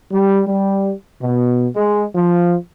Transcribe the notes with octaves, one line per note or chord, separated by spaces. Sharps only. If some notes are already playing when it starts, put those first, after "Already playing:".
G3
G3
B2
G#3
F3